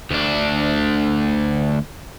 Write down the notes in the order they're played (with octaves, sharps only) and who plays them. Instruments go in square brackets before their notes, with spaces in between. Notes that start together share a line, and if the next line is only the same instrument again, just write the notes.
[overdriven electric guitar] D2 D4